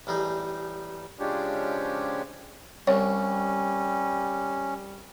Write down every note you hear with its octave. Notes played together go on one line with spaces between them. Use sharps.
A1 G3 D#4 G#4
C#3 F3 G#3 C#4 D4 G4
C2 G3 C#4 C#5